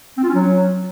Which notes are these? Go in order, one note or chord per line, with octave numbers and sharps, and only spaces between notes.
C4
F4
C#4
F#3